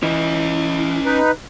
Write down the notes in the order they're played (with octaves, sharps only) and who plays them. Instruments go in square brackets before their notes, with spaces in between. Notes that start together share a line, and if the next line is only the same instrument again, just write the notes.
[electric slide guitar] E3 [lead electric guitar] C#4 D#5
[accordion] D#4 B4